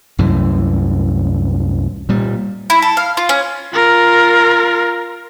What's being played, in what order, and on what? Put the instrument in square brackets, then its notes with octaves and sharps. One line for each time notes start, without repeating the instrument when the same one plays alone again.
[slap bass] C2 F#2 A2 E3
A#2 G3
[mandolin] E4
A4
F5
F4
C#4
[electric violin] F4 A#4